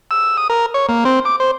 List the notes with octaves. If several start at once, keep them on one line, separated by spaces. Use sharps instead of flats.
E6
D#6
A#4
C#5
A#3
C4
D6
C5